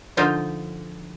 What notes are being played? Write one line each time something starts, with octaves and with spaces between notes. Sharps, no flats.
D3 F3 D#4 F4 C5